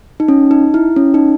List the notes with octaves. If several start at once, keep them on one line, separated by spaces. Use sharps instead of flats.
D#4
C#4
D#4
E4
C#4
D#4